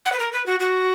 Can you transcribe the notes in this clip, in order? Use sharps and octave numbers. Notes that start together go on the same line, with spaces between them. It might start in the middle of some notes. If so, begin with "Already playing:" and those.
F#5
B4
A#4
B4
F#4
F#4